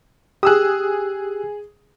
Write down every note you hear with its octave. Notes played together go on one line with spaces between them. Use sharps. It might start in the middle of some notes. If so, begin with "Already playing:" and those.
G4 G#4 D#6 E6 F#6